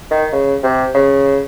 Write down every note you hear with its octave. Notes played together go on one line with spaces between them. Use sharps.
D#3
C#3
C3
C#3